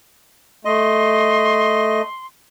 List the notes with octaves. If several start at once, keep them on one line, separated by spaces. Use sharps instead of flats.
A3 D#5 C6